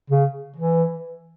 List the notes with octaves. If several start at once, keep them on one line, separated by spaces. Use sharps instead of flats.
C#3
E3